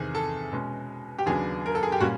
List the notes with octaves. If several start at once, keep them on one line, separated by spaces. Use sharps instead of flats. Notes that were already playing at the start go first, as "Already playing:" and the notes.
Already playing: E2 C3 D#3 G#4
A4
B2 G#3 C#4
G4
D#2 C#3 F#3 B3 D4 G#4
A#4
A4
G#4
G4
A#2 G3 A#3 C#4 F#4